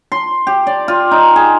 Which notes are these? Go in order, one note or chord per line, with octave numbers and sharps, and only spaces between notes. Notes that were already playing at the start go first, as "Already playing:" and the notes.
C6
G4
D5
F4
D#4
G#4